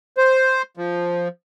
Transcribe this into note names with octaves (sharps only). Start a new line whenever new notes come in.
C5
F3